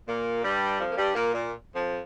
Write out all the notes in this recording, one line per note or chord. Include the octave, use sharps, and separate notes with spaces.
A#2 A#3
G2 G3
F2 F3
A#3
G2 G3
A#2 A#3
A#2
F2 F3